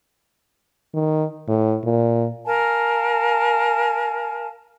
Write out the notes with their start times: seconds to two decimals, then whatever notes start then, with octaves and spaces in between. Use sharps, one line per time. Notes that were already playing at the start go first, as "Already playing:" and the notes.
0.94 D#3
1.48 A2
1.84 A#2
2.45 A#4 F5 G#5 A5